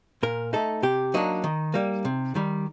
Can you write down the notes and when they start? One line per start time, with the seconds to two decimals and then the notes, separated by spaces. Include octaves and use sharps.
0.23 A#2 A#4
0.53 A3 D#4 A4
0.83 C3 G4
1.14 F#3 A#3 D4 D#4
1.44 D#3
1.74 G3 A#3
2.05 C3
2.35 D#3 G3